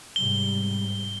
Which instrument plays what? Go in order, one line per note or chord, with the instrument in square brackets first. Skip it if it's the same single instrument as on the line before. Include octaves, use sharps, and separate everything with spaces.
[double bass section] G#2 C3 G3 [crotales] G7